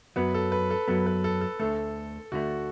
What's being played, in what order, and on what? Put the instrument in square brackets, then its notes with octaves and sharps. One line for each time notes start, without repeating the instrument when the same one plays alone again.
[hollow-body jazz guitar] F#2 F#3 B3 [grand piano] B4
[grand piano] A4
B4
A4
[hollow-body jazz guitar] F#2 F#3 B3 [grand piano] A4
[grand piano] B4
A4
A4
[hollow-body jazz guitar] D2 D3 A3 [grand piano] A4
[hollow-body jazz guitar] D2 D3 A3 [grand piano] F#4